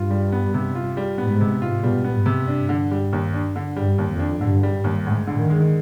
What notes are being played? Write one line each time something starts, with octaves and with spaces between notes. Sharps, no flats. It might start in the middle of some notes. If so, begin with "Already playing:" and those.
Already playing: G2 F4
G3
B3
C3
F4
G3
G#2 B3
C3
F4
B2 G3
B3
G#2
C3
G2 D4
D3
G3
D#2
D4
D3
G2 G3
D#2
F2
D4
G2 D3
G3
D#2
D2 G#2
D3
D#3
G#3